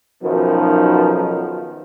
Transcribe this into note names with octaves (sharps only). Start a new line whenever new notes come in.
B1 F#2 D#3 F3 B3